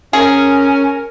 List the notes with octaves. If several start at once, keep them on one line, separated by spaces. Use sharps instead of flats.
C#4 G#4 A#4